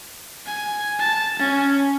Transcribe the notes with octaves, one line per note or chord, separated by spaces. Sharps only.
G#5
A5
C#4